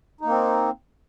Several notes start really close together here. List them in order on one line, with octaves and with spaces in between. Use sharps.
D#4 A#3 C4